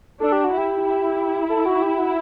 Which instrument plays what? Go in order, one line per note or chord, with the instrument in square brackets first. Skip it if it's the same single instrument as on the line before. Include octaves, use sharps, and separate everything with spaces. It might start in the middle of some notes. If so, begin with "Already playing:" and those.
[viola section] D4 [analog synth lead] A4
[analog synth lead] G4
F#4
[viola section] E4
[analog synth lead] G4
[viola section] E4
[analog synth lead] A4
F#4
G4
F#4